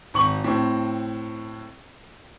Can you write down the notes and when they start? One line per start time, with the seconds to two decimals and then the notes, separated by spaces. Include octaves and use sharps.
0.14 G#1 C#6 F#7
0.44 A2 C4